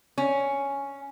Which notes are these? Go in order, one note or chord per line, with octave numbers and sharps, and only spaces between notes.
C#4